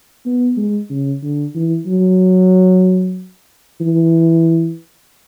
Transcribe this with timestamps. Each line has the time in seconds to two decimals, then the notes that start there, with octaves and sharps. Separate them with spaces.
0.26 B3
0.57 G#3
0.90 C#3
1.23 D3
1.55 E3
1.86 F#3
3.81 E3